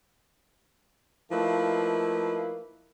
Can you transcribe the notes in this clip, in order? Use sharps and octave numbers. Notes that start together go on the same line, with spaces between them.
F3 A3 A#3 D#4 E4 B4